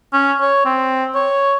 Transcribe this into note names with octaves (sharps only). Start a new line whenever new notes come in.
C#4
C#5
C4
C#5